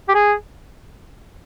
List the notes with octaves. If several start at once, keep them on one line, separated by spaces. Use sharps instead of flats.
G4
G#4